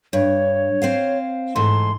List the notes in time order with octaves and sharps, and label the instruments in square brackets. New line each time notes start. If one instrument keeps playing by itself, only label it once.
[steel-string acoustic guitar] G2 [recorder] C#5
[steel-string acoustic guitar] C4 C5 F5
[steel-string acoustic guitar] G#2 E3 A3 [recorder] C6